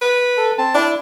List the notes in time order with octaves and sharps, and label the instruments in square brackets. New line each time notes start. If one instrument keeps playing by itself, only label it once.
[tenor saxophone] B4
[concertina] A4
C4 A5
[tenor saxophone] D4 [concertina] E4